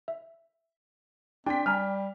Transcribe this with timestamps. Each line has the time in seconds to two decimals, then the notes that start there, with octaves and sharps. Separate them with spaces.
0.08 E5
1.46 C4 D4 G5 B6
1.66 G3 D5 G#5 A#5 F6